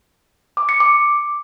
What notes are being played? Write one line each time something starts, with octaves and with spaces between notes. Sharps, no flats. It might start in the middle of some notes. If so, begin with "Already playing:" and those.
D6
C#7
D6